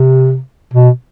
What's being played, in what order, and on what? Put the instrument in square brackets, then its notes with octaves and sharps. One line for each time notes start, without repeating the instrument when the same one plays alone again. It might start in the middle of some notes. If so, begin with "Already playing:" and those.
Already playing: [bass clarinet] C3
B2